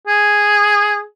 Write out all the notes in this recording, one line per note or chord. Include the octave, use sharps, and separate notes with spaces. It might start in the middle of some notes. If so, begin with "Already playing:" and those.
G#4